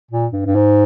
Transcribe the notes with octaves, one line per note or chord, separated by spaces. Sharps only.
A#2
G2
G2
G#2